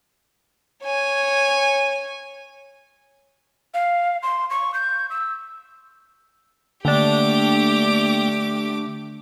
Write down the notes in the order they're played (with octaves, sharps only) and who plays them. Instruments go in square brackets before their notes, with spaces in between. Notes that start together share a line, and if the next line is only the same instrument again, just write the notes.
[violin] C#5 G#5
[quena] F5
C6
C#6
G6
E6
[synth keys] D3 D4 [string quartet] A3 G4 D6 [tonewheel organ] A#3 G5